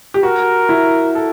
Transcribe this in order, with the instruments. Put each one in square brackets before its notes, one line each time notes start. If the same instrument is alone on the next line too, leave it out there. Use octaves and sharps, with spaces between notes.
[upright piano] G4
[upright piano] F#4 [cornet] A#4
[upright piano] E4
A4